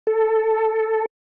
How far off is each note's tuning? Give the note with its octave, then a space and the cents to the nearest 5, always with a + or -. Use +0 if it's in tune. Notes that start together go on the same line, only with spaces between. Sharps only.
A4 +5